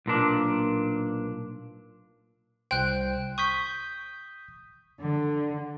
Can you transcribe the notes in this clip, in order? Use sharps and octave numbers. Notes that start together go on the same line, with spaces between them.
B1 A#2 D4
C2 C5 G5 F#6
C#6 D#6 G6 B6
D3